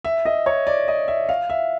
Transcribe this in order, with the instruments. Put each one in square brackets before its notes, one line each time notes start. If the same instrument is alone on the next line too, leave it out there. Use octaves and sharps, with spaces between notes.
[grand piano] E5
D#5
C#5
D5
D#5
E5
F5
E5